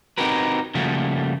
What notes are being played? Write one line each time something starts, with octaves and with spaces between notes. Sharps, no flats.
C4 D#4 F#4 G4 A#4 B4
C#3 F3 G3 A3 A#3 F#4